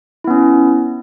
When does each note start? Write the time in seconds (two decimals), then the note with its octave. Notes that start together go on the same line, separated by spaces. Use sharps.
0.24 E4
0.27 B3
0.30 C#4